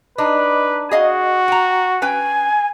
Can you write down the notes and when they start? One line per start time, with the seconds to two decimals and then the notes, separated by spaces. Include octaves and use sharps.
0.18 D4 D#4 B4
0.91 F#4 G#4 D#5 F5
1.48 G5 A#5
2.02 C#4 B4 G5 G#5